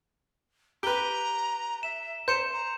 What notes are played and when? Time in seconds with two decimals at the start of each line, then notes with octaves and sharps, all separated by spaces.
0.83 G4 B4 A#5 D7 G7
1.83 E5 E7
2.28 C5 A#5 G6 C#7 E7
2.53 A#5